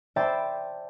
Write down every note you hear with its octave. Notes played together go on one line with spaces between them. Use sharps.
C5 D5 E5 G5 A5 B5